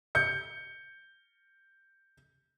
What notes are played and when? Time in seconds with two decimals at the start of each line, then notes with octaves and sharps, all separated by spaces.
0.15 G6 C#7